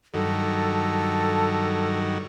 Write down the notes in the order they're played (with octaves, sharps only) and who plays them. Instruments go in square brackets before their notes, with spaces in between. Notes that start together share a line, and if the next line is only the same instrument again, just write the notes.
[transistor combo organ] G2 D#3 F#3 [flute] A4